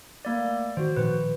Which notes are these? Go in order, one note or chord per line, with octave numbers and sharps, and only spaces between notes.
A3 A#3 D5
D#3 F#4 C5
A#2 D#3 F3 B4